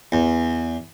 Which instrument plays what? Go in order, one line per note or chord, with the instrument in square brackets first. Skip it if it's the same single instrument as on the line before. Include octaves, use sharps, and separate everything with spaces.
[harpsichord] E2